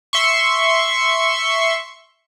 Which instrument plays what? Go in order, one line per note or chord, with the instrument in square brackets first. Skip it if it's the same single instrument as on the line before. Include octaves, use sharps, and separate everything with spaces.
[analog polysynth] E5 C6 C#6